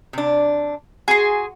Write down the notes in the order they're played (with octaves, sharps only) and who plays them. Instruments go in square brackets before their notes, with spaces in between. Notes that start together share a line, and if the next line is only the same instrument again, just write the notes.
[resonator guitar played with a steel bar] C3 D4
[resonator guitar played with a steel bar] F#4 [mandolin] G#4 C6